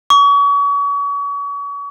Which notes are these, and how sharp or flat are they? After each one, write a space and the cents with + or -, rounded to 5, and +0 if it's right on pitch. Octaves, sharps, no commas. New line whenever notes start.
C#6 +40